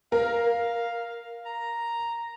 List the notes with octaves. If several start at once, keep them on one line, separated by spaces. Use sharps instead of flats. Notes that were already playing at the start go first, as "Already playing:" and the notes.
A#4 F5
A#5